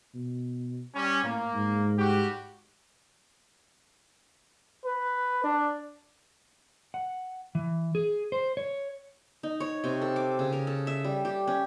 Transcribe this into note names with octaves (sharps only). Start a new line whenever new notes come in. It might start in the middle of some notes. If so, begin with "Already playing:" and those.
B2
G3 C#4
A2 A#3
G#2
G3 F#4 G4
B4
D4
F#5
E3
G#4
C5
C#5
D#4
C#5
C3
A4
D6
C#3
A#4
A4
E5
G3
G4
C#4